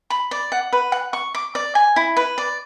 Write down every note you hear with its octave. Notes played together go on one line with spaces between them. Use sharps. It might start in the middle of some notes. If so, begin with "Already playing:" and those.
B5
D5
F#5
B4
F#5
C#6
D6
D5
G#5
E4
B4
D5